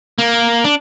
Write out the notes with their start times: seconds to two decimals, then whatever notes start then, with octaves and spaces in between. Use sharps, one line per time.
0.18 A#3
0.64 D4